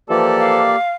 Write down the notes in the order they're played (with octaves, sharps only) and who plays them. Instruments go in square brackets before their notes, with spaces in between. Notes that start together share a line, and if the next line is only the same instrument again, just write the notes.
[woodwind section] E3 F3 [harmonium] A#3 G4 D5 [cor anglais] A4
[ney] F5